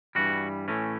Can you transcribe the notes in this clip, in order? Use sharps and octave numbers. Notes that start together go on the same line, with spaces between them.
G2 E3 G3 F#4
A2 E3 A3 C#4